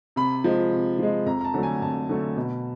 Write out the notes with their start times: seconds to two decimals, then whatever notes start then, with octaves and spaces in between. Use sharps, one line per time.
0.16 C3 B5
0.44 F3 G#3
0.72 C3
0.99 F3 G#3
1.26 F2 A#5
1.41 A#5
1.45 A5
1.54 D3 F#3 A3
1.63 G#5
1.82 F2 A5
2.09 D3 F#3 A3
2.37 B2